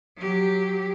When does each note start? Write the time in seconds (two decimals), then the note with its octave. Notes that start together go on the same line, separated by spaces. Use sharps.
0.17 F#3 G4